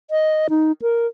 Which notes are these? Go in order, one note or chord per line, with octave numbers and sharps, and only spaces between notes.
D#5
D#4
A#4